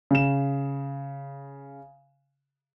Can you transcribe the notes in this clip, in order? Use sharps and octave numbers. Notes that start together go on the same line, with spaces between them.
C#3 E7